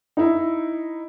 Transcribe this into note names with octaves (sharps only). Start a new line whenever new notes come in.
D#4 E4